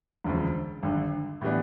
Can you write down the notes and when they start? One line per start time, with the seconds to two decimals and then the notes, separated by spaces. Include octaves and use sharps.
0.24 E1 D2 C#3 F3
0.83 G#1 G2 D3
1.41 A2 E3 G3 B3 D4